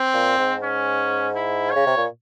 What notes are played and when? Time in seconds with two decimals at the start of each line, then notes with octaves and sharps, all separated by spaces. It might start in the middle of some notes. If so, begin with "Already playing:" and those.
Already playing: C4
0.14 A#2
0.38 G#2
0.63 C#4
1.35 E4
1.71 C#3 C#5
1.87 C3
1.97 A#2